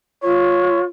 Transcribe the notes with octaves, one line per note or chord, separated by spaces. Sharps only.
F4 C#5